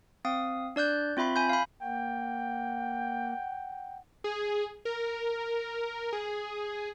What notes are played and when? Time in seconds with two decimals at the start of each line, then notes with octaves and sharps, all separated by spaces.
0.25 C4 F5 D#6
0.76 D4 D5 F#6 G6
1.17 C4 F4 E5 B5 C6
1.36 G#5 B5 G6
1.49 F5 B5
1.82 A#3 F#5 G5
4.24 G#4
4.85 A#4
6.13 G#4